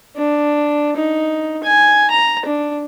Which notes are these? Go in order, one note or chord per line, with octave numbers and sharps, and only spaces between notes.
D4
D#4
G#5
A#5
D4